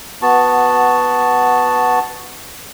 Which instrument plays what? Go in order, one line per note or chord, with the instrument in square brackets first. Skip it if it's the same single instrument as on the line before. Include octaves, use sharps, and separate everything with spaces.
[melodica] B3 F#4 A5